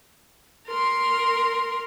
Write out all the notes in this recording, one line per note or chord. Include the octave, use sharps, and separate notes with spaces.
A#4 C6